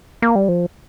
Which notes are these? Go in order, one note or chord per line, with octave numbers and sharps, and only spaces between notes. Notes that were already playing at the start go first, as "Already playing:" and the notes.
A#3
G3
F3